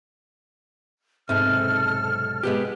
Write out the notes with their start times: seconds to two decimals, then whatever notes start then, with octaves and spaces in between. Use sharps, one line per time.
1.29 B1 G#2 C3 A4 F6
2.43 G#3 B3 G4